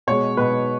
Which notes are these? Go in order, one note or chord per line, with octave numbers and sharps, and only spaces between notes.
B2 G#3 C#5
B2 G#3 B4